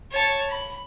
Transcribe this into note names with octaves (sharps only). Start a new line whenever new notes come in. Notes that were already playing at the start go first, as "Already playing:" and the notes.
C#5 A5
B5